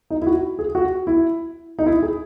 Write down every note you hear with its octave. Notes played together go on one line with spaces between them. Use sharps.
D#4
E4
F#4
G#4
F#4
E4
D#4
E4
G#4